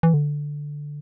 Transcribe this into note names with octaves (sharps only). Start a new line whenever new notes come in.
E3
D3